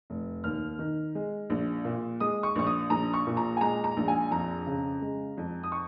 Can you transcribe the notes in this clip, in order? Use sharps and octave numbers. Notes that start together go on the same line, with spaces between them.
F1
D#2 F6
D#3
G#3
A#1
A#2
G#3 D#6
C#6
A#1 C#6
D#6
A#1 A#5
C#6
A#2
A#5
G#5
G#3 A#5
A#5
A#1
G#5
F2 A#5
C#3
G#3
F2
D#6
C#6